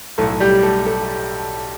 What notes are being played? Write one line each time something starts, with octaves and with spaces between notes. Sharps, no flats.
B1 A2 F#3 A3 A4
G3 G4
A3 A4
A3 A4